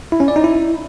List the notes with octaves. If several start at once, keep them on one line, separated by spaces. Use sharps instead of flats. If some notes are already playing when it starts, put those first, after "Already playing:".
E4
C#4
D5
D#4
E4